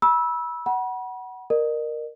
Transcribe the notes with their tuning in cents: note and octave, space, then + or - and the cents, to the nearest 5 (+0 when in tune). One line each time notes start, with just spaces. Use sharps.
B5 -30 E6 -10
F#5 +15 B5 -40
A#4 +0 D#5 -40